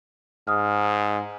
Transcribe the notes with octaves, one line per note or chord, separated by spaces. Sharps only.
G#2 D#6 F6